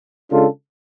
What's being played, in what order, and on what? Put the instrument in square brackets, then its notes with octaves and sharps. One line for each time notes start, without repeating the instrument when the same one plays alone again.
[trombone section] C#3 G#3 D4 F4 A4